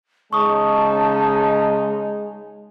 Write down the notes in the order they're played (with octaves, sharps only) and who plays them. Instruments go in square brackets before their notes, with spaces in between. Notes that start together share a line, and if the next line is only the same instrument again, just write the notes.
[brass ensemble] C#3 C#4 D#4 [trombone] G#3 [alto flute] A5 [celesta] C#6 D#6